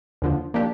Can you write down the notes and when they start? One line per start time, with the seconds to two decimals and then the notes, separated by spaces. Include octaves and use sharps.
0.22 D#2 D3 F3
0.54 F3 A#3 D4 G4